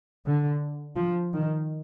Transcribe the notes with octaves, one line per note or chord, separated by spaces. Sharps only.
D3
F3
D#3